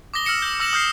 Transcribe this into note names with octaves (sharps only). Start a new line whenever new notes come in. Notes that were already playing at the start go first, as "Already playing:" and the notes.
D6 D#6 A#6 G7
E6 F6 A#6 C#7 E7
G6 G7
D6 E6 A#6 E7 F#7
D#6 F6 G6 C7